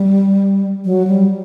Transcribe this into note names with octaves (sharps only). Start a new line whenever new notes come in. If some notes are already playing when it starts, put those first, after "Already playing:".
Already playing: G3
F#3
G3